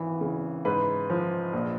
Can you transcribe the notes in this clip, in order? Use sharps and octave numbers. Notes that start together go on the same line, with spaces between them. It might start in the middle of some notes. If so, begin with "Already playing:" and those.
Already playing: G#1 E3
C#3
G#2 B4
F3
A#1